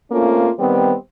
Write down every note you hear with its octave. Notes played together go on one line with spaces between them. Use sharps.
A3 A#3 C4 C#4 F4
D#3 G3 B3 C4